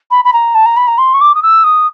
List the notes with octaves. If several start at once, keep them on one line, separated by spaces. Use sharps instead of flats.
B5
B5
A#5
A5
A#5
B5
A#5
C6
C#6
D6
D#6
E6
D#6